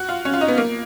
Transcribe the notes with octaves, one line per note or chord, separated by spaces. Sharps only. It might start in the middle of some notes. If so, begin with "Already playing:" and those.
Already playing: F#4
F4
C#4
F4
D#4
B3
A#3